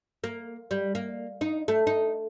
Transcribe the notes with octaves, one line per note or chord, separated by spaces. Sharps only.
A#3
G3
A#3
D#4
A3
D#4